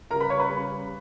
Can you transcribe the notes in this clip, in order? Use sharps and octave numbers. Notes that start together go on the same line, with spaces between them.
C#3 G3 A#4 A#5
B4 B5
C#5 C#6
B4 B5
C#3 G3